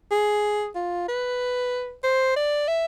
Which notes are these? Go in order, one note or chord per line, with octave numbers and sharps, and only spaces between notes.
G#4
F4
B4
C5
D5
E5